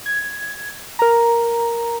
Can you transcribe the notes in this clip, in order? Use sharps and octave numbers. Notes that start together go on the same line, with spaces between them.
G#6
A#4 A#5